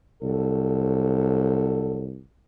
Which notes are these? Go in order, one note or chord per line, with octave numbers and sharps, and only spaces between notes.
C2 F2 F#3 A4